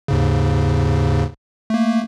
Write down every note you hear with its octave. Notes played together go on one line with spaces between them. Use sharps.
D#2 G#2 C#3
A3 A#3